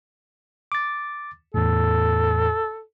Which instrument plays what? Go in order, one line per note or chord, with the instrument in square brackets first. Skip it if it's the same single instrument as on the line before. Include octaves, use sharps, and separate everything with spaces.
[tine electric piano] D6 A6
[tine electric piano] E2 A2 [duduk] A4